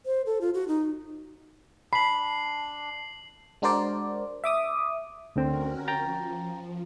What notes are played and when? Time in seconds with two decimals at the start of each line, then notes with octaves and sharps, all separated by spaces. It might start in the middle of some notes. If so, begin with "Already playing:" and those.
0.06 C5
0.26 A4
0.41 F4
0.54 F#4
0.68 D#4
1.93 D4 B5 C7 F#7
3.62 G#3 D4 F#4 A#4 C5 D5
4.44 E5 D6 D#6
5.36 D2 D3 C4 C#4 F#4 A#4
5.88 F3 G5 A#5 A6